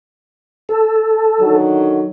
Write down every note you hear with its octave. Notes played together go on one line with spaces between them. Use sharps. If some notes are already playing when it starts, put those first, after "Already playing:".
A4
D3 D#3 F#3